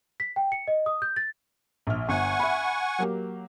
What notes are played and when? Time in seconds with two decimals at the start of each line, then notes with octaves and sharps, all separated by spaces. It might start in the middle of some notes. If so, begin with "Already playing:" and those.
0.20 B6
0.36 G5
0.52 C#7
0.67 D#5
0.86 D#6
1.02 G6
1.16 A6
1.87 A#1 F6
2.09 G1 F#5 G#5 C#6
2.40 E5 B5
2.99 F#3 A#3 G4